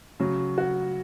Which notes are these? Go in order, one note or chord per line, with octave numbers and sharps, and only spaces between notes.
C#3 F#3
F#4